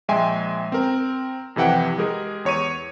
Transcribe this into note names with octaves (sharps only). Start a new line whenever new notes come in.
A#1 G#3 E5 G5 G#5 C6
C4 A#4
F2 C3 E3 F#5 G5
G#3 G4 G#4 A#4
E2 C#5 C#6 D#7